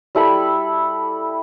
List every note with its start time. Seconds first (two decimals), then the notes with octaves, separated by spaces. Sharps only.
0.15 G3 E4 A4 B5